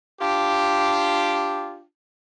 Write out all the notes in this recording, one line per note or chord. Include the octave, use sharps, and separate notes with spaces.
D4 F4 G4